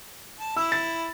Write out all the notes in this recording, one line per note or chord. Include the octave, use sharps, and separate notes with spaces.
A5
E4 E6
A6